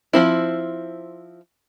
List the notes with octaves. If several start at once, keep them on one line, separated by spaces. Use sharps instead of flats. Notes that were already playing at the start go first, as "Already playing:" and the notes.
F3 C4 E4